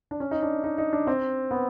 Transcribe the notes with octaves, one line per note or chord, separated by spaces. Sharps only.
D4
C#4
D#4
D4
D#4
D#4
D4
C4
B3